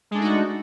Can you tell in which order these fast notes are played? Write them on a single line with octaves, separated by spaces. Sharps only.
G#3 D4 A3 D#4 F#4